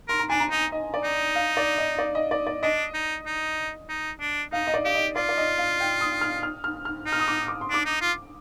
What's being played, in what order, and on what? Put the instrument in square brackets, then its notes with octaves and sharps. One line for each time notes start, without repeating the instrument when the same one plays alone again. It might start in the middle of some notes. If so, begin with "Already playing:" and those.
[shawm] A#4 [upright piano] C6
[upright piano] A#5
[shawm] D4 [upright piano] G#5
[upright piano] A#5
[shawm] D#4
[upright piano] D#5
D5
[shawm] D#4
[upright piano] F5
D5
D#5
D5
D#5
D5
D5
[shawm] D4 [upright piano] D#5
[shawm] D#4
D#4
D#4
D4
[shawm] D#4 [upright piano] F5
[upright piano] D#5
D5
[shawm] G4 [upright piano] F5
[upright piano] D#5
[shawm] F4 [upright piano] D5
[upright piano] D5
D#5
F5
G5
D#6
F6
F6
F6
F6
[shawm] D#4
[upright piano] F6
D#6
D6
D6
C6
[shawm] D4 [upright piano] D6
[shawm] D#4
F4